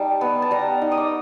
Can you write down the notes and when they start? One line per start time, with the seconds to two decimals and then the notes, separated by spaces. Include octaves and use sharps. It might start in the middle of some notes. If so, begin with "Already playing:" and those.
Already playing: G3 D#4 A5
0.21 B3
0.42 A5
0.51 G3 A#5
0.82 D#4
0.92 D#6
0.97 D6